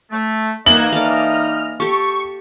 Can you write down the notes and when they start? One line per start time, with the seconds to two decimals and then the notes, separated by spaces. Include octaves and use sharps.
0.11 A3
0.66 E3 A#3 D#4 D#5 F#5 G#6 E7 F#7
0.93 A#3 A4 D5 F6
1.80 G4 A4 C#6